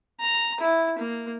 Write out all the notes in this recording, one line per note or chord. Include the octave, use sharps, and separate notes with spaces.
A#5
E4
A#3